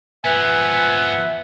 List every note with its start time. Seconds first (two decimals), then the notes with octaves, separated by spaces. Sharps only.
0.25 F3 B3 B4 E5 G#5